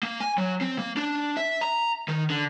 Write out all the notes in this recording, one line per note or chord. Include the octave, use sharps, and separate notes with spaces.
A#3
G#5
F#3
C4
A#3
D4
E5
A#5
D#3
D3